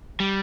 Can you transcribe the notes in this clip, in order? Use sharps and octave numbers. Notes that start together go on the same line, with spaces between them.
G3